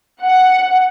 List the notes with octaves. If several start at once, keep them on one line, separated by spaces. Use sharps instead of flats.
F#5